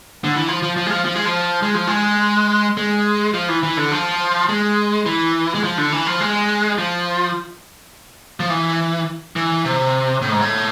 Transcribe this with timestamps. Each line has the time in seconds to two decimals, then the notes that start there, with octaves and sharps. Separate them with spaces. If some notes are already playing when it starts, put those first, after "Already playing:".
0.24 D3
0.36 E3
0.48 F3
0.63 F3
0.77 F3
0.87 G#3
0.91 F3
1.05 F3
1.15 G#3
1.25 F3
1.63 G#3
1.74 F3
1.87 G#3
2.77 G#3
3.34 F3
3.49 E3
3.63 E3
3.77 D3
3.92 F3
4.49 G#3
5.06 E3
5.55 G#3
5.64 F3
5.78 D3
5.92 E3
6.07 F3
6.21 G#3
6.78 F3
8.40 F3
8.50 E3
9.36 E3
9.65 C3
10.22 A2
10.32 G#2
10.41 A2